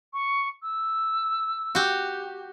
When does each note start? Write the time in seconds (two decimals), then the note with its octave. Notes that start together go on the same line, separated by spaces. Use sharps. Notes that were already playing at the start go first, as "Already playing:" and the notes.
0.13 C#6
0.62 E6
1.75 F#4 G4